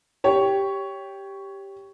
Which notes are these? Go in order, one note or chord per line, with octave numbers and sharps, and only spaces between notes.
G4 C#5